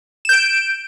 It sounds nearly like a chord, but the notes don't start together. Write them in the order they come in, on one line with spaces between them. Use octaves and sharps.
E7 G6 D7